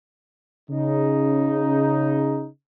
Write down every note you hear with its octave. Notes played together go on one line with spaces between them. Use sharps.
C#3 D#4